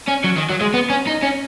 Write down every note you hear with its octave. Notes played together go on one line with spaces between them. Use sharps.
C#4
F#3
D#3
F#3
G#3
B3
C#4
D#4
C#4